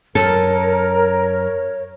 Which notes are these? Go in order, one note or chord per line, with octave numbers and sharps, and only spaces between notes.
F#2 A4 A#4 C#5